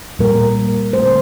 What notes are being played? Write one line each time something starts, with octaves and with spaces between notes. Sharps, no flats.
A#2 G3 A#3 A#4
D3 A3 C5